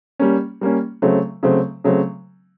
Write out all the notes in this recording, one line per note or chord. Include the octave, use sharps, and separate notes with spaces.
G3 A#3 C#4
G3 A#3 C#4
C#3 F#3 A3 C4
C#3 F#3 A3 C4
C#3 F#3 A3 C4